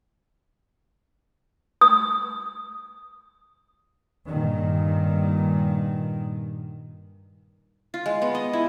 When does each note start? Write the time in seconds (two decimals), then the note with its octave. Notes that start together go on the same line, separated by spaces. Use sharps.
1.81 D#6
4.28 G2 A#2 D#3
7.94 F4
8.06 G#3
8.22 B3
8.35 D#5
8.53 E4